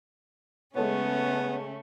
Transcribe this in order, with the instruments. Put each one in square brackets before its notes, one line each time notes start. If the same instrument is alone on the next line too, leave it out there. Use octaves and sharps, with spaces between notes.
[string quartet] C#3 A3 C#4 [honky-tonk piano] G#3 A4 C#5 [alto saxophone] B3